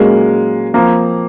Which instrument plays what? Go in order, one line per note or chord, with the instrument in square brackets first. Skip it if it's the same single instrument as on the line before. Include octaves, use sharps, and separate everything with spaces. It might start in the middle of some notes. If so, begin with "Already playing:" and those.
Already playing: [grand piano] A#2 F#3 A#3 C#4 F#4 [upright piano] G#3
[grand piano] F3 C4 F4 [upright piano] A#3